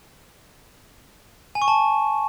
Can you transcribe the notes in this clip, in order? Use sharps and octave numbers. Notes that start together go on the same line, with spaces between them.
G#5
C#6
A5